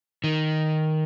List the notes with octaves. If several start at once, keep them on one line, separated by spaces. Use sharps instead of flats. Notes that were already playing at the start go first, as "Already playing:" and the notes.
D#3